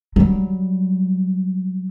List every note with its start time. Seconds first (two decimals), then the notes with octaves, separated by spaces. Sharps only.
0.16 F#3 G3